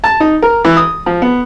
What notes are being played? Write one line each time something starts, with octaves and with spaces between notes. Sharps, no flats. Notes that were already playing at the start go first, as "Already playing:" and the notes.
A5
D#4
A#4
E3
D#6
F3
B3